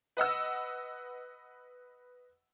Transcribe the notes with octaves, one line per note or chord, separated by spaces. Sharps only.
B4 D#5 F#5 E6